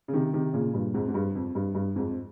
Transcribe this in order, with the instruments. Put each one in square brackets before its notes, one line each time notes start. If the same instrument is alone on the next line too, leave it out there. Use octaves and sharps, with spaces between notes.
[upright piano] C#3
C3 D#3
C3 D#3
A#2 C#3
G2 A#2
F2 G#2
G#2
G2
F2
G2
G2
F2 G#2